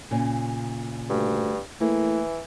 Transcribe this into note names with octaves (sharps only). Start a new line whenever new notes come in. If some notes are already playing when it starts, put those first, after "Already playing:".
A#2 C#3
D2 G2
A2 E3 A#3